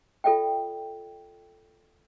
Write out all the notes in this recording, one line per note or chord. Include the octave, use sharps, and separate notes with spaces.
F4 A4 D5 E5 G5